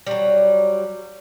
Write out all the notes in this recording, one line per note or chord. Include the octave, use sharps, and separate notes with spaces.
F#3 G3